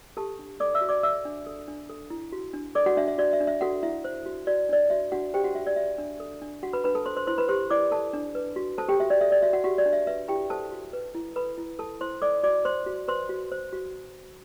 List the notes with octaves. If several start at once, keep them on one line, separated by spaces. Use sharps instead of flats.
G4 A4 A5
D4
A4 D5 D6
E5 E6
F#4
D5 D6
A4 E5 E6
D4
A4
D4
A4
E4
F#4
D4
A4 D5 D6
F#4 F#5
D4 E5
E5
F#4 D5
E5
D4
E5
F#4 A4 F#5
E4 E5
C5
F#4
F#4 D5
D4 D5
F#4 E5
D4 F#4 F#5
G4 C5 G5
F#4 F#5
F#4 E5
D5
F#4 E5
D4
A4
D4
F#4 F#5
B4 B5
D4 B4 B5
A4 A5
A4 C5 C6
C5 C6
E4 C5 C6
B4 B5
G4 C5 C6
E4 D5 D6
A4 A5
D4
B4
F#4
A4 C5 A5
G4 G5
F#4 E5
D5
A4 E5
D5
F#4 E5
F#4 F#5
F#4 G4 F#5
D5
D4
E5
B4 E5
E4 G4 G5
A4 C5 A5
F#4
B4
E4
A4 B4 B5
E4
A4 A5
E4 C5 C6
A4 D5 D6
F#4 D5 D6
C5 C6
F#4
B4 C5 C6
F#4
C5
F#4